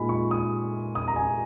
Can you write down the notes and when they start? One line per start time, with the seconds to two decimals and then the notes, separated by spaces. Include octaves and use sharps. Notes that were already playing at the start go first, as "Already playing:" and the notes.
Already playing: A#2 G#3 D#4 G#5 B5
0.09 C#6
0.31 D#6
0.95 D#6
1.08 A#5
1.16 G#5